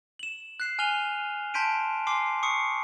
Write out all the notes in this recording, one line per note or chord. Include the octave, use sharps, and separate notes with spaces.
E7 F#7
F#6 C7 E7
G#5 F6 D#7 F7 G7
A5 C6 G6 B6 D7 D#7
G#5 C6 D6 C7
C#6 D#6 C7 C#7